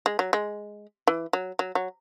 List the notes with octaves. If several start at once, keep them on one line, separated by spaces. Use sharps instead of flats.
G#3
F#3
G#3
E3
F#3
F#3
F#3